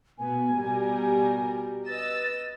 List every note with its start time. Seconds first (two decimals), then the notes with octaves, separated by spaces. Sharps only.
0.18 B2 B3 G#5
0.55 B2 G3 A#4
1.87 B4 D#5 E6 A6